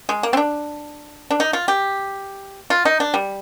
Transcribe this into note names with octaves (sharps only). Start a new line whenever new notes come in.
G#3
A#3
C4
D4
D4
D#4
F4
G4
F4
D#4
D4
G3